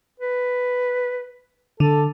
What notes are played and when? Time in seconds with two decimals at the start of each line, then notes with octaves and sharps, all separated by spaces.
0.20 B4
1.80 D3 A4